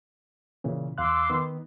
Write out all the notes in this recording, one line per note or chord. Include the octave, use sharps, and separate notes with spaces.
A#2 C#3 E3
E2 F5 C6 D6 E6 F#6
D#3 B3